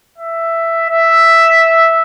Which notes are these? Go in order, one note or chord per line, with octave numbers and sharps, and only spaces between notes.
E5
E5